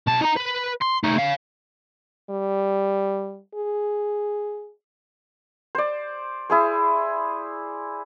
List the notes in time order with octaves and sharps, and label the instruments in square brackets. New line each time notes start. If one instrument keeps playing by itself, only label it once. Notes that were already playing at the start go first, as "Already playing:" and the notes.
[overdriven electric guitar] B1 A5
D#4 A#5
B4
C6
A3 D#4
C#5 F5
[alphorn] G3
G#4
[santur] C5 D5
E4 G#4 C5